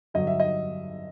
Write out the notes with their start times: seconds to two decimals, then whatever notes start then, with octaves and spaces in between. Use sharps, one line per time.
0.14 G2 D3 F#3 D#5
0.27 E5
0.40 D#5